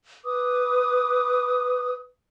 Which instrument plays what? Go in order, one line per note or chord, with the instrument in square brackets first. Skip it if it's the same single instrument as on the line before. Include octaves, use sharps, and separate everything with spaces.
[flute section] B4 D6 D#6